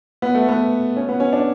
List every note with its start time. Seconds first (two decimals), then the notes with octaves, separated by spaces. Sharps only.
0.22 B3
0.35 A3
0.49 B3
0.97 C#4
1.09 B3
1.20 C#4
1.33 D4